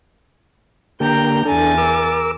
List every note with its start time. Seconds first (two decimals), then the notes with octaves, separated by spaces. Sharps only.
1.00 D3 A#3 G4 G5 A#5 G6
1.45 E2 D4 A4 G#5 A6
1.78 A#4 D6 E6